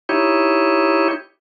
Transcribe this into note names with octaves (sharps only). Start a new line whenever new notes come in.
D#4 E4 G4 C#5